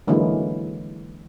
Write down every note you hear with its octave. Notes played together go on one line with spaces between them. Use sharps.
D3 E3 F#3 G#3 A#3